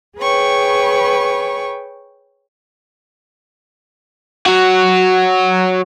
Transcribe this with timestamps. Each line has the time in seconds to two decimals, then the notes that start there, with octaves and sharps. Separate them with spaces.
0.19 G#4 B4 C#5 G5 C#6
4.46 F#3 F#4